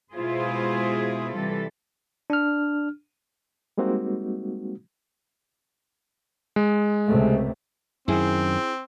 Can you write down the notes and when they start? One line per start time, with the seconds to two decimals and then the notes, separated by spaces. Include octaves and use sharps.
0.13 B2 G#3 E4 F4 G#4 C5
1.33 C3 E3 G3 A4
2.30 D4 F6
3.78 G3 G#3 A#3 C4 D#4 F#4
6.56 G#3
7.08 C#2 C3 A3
8.08 F#2 D#3 C4 E4 G#4